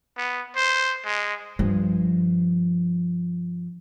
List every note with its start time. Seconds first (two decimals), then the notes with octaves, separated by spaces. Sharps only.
0.17 B3
0.56 C5
1.05 G#3
1.59 G2 F3